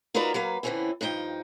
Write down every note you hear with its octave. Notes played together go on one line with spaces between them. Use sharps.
D#4 F4 F#4 A#4 B4 D5
F#3 A#3 B4 F5
D3 E3 F#3 C4 C#4 E4
G2 F3 D#4 E4 G5